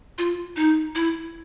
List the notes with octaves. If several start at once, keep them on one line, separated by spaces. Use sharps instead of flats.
F4
D#4
E4